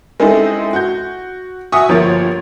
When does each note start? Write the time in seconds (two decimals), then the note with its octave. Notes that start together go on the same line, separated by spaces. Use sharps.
0.20 G#3 C4 C#4 D#4 E4 A4
0.73 F#4 G6
1.72 F#4 E5 G#5 C#6 D#6
1.89 G1 F3 A#3 C#5 A6